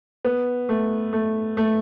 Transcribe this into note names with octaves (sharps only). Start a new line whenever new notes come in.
B3
A3
A3
A3